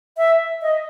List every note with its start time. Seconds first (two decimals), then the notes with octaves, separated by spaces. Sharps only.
0.17 E5
0.62 D#5